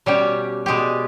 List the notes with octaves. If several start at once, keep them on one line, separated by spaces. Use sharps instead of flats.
B2 G3 C#4 G4
B2 G#3 B3 G4